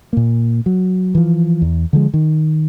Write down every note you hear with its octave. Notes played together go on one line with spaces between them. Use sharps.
A#2 A#3
F#3
E3 F3
E2
D3 F3 G#3
D#3